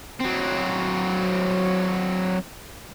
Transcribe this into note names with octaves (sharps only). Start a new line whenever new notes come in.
F#3 C4